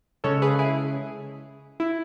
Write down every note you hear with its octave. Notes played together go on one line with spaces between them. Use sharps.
C#3 G#3 C#4 A4 C#5
G#4 B4
E4 G#4
E4